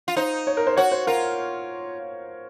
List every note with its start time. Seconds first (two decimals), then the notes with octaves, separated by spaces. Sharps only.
0.08 F4
0.17 D#4 C5
0.47 C#5
0.57 A#4
0.67 C5
0.77 F#4 C#5
0.92 C5
1.07 F4 A#4